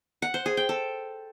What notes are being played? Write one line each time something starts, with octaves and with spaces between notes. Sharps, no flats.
F#5
C5
G#4
G5
A4